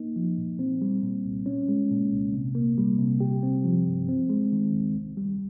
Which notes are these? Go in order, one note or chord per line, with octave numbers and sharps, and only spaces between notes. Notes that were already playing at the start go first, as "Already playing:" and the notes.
Already playing: A#3 D#4
F3
A#2
C4
G3
A#2
C2
C#4
G#3
A#2
C2
C3
A#3
G3
C3
G4
C4
F3
G2
C4
G#3
D#3
D#2
C2
G3